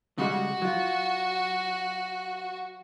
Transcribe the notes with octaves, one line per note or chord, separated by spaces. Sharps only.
C#3 G3 G#3 F#4
F#3 F4